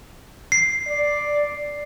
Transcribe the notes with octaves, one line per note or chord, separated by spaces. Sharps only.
C7
D5